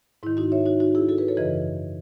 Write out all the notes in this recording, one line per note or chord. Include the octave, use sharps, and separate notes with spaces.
G#2 D#3 E4
D#4 F#4
C#5 E5
D#4 F#4
D#4 F#4
E4 G#4
F#4 A4
G#4 B4
A4 C#5
F#2 C#3 E3 B4 D#5